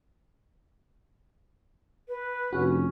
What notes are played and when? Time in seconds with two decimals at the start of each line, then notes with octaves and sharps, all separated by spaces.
2.08 B4
2.53 F1 C#4 F#4